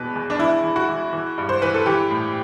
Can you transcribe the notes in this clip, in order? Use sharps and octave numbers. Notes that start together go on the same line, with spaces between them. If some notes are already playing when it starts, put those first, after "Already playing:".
Already playing: E2 B2 E3 B4
E2
D4
E3 E4
E3
F#4
E3
E3
G2
C5
E3 B4
A4
E3 G4
A2